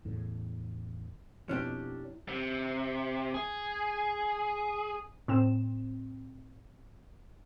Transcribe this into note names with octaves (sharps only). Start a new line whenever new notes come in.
E2 A2 C#3
F2 B2 C#4 D4 E4 G4
C3
G#4
A2 C4 E7